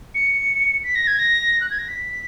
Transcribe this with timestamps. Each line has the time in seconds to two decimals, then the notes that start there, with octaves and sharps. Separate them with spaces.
0.14 C#7
0.84 B6
0.95 A#6
1.07 G#6
1.19 A#6
1.61 F#6
1.70 G#6
1.78 A#6
1.88 B6